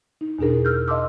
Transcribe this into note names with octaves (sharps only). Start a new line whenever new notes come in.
D#4
E2 B2 D4 G#4 A#4
A#4 E6 F6 G6
D#5 F5 A5 C6 D6 E6